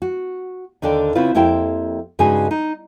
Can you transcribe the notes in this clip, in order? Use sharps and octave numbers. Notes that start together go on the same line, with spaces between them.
F#4
D#2 D3 D4 D5 G5
C#3 C4 E4 F4 B4
F2 A#3 E4 G4 C5 G5
G2 C#3 G#3 D#4 F#4 G#5
D#4